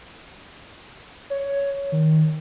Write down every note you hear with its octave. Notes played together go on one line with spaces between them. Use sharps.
C#5
D#3